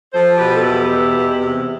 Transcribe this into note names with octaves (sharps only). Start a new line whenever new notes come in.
F3 A4 C5
B2 G4 B4
A4
E2 E4 G4
B2
E2
C3